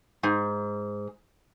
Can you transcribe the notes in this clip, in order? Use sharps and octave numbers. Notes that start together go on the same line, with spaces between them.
G#2